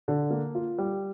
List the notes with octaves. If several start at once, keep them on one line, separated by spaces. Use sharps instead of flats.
D3
A#3
F4
G3